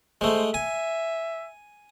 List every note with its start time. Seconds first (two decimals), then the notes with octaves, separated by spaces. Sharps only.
0.21 G#3 A3 C5
0.54 E5 G#5